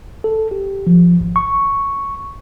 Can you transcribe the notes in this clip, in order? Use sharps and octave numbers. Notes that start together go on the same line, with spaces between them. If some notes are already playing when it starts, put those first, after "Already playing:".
A4
G4
F3
G#1
C#6